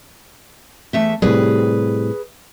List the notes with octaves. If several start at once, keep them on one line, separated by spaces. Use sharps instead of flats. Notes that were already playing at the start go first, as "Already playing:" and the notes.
E2 A3 E5
A2 C3 G3 G#4 B4